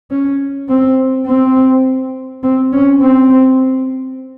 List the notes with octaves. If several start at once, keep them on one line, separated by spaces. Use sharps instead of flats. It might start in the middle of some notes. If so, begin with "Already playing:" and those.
C#4
C4
C4
C4
C#4
C4